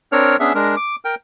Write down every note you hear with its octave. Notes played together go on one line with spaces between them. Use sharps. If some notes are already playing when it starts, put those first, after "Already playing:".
C4 D4 A#4 C#5 F6
B3 C#4 D4 G#4 E5
G#3 D4 A#4
D6
A#4 G5